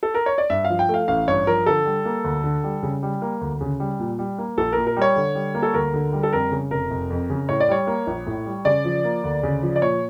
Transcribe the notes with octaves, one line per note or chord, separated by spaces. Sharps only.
A4
A#4
C#5
D5
G2 E5
F5
F3
G5
A3 F5
A1 F5
G2 C#5
F3 A#4
D3 A4
G3
A#3
D2
D3
G3
C#3
G3
A#3
D2
C#3
G3
A#2
G3
A#3
A#1 A4
A#2 A#4
A#4
G3
C#5
D3
G3
A#3
A4
D2 A#4
D3
G3
A4
F2 A#4
C#3
F1 A#4
F1
F2
C#3
A2 C#5
D5
G3 C#5
A#3
A#1
A2
G3
C#3 D5
F3
A#3
D2
C#3
F3
D5
A#2 C#5